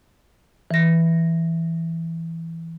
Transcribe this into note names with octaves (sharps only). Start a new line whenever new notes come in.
E3 A#6